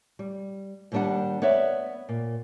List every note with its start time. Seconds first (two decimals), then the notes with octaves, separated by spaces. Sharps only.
0.19 G3
0.92 D#2 D#3 G3 D4 G4 F#5
1.42 B3 C#5 D5 E5
2.09 A#2